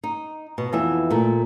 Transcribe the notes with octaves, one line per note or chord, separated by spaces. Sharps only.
D#4
B2
F2 E3 B3 E5
A#2 A3